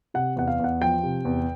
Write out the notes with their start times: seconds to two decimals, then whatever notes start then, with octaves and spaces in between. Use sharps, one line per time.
0.14 C3 F#5
0.36 E2 F#5
0.48 F5
0.59 E2
0.64 F#5
0.81 F3 G5
1.03 C3
1.25 E2